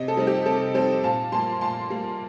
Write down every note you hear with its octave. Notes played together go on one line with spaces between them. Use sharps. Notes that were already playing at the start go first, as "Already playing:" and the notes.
Already playing: C3 D#5
A4
G3 C4 D#4
G4
C3 A4
G3 C4 D#4 A4 C5
A#2 F5 A5
G3 A#3 A5 C6
A#2 A5 C6
G3 A#3